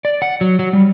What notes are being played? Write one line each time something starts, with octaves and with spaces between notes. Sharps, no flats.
D5
F#5
F#3
F#3
G3